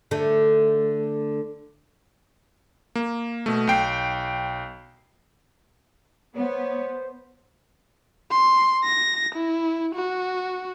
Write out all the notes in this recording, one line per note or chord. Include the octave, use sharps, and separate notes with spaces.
D3 A3
A#3
B2 A3
B1 G5 C7
B3 C5 C#5
C6
A#6
E4
F#4